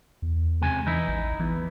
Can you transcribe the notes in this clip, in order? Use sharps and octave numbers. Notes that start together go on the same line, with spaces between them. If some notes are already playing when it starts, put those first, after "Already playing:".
E2
C#2 C3 G#5
E3 D#4 E4
A1
E2 E3